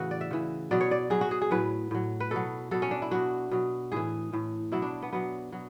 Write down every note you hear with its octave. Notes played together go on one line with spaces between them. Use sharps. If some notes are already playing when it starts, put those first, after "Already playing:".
Already playing: A2 C#3 E3 F#4
D5
E5
C#3 E3
B2 F#3 D5
C#5
D5
B2 F#3 G#4
F#4
G#4
G#4
A2 F#3 B4
A2 F#3
B4
B2 F#3 A4
B2 F#3 A4
C#4
D4
E4
B2 F#3 F#4
B2 F#3
A2 E3 G#4
A2 E3
B2 F#3 E4
D4
B3
B2 F#3 B3
B2 F#3